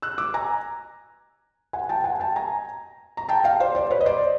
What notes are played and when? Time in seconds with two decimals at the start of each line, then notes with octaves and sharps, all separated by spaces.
0.02 E6 F#6
0.18 D6 E6
0.34 G#5 A#5
1.73 F#5 G#5
1.89 G5 A5
2.04 F#5 G#5
2.20 G5 A5
2.36 G#5 A#5
3.17 A#5
3.29 G5 A5
3.44 F5 G5
3.60 C5 D5
3.75 C5 D5
3.91 B4 C#5
4.01 D#5
4.06 C5 D5